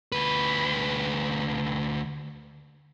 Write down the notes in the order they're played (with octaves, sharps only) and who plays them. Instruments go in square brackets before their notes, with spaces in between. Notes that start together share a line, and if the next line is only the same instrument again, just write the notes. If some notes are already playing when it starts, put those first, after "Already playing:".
[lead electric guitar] D2 B4